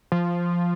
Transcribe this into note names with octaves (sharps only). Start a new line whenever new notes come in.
F3